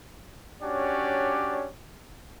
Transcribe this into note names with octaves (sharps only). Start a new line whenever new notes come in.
C#4 D4 F#4 G4 C#5 D5